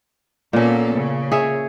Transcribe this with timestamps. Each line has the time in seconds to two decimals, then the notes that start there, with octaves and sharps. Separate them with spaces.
0.53 A#2 A#3 B3 C#4 A4
0.94 C#3
1.32 G#4 C#5 E5